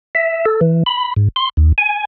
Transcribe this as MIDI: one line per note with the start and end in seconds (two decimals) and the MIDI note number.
0.15 0.45 76
0.45 0.60 69
0.61 0.83 52
0.86 1.14 83
1.16 1.28 44
1.36 1.49 84
1.57 1.72 39
1.78 2.05 80